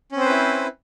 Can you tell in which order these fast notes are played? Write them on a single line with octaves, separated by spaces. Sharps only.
C#4 C4 C5 B4 E4